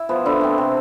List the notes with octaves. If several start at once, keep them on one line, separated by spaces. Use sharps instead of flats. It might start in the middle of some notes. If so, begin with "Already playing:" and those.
Already playing: E4
F3 B3
D3 E4
A3 C4
C3